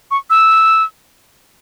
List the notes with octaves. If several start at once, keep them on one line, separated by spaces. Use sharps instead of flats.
C#6
E6